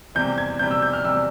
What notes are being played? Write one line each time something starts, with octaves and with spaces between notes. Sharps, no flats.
E2 C3 G3 G6
G#6
E2 C3 G3 G6
E6
G6
F6
E2 C3 G3 E6